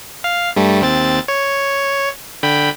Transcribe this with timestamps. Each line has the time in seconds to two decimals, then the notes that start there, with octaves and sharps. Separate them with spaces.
0.24 F5
0.56 G2 G3 A3
0.81 D#2 C4 A6
1.28 C#5
2.43 D3 G5 B5